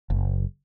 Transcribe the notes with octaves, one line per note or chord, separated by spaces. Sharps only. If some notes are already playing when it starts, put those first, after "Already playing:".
F#1